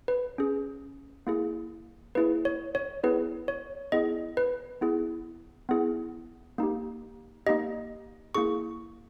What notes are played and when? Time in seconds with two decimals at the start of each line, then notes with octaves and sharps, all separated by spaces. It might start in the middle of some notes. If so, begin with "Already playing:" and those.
0.08 B4
0.38 C#4 G#4
1.27 A#3 E4 G#4
2.15 A#3 E4 G#4 B4
2.45 C#5
2.75 C#5
3.03 B3 E4 G#4 B4
3.48 C#5
3.92 B3 E4 G#4 D#5
4.37 B4
4.81 B3 E4 G#4
5.69 B3 E4 G#4
6.58 A#3 D#4 G4
7.46 A#3 D#4 G4 D#5
8.35 A#3 E4 G#4 C#6